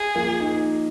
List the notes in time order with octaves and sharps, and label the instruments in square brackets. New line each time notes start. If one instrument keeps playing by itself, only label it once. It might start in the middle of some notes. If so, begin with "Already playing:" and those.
Already playing: [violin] G#4
[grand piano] F3 A#3
D#4